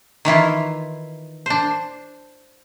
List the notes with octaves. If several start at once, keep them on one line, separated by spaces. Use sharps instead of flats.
D#3 E3 E4 F4
D4 C5